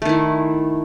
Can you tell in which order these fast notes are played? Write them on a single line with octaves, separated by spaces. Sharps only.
A3 D#3 E4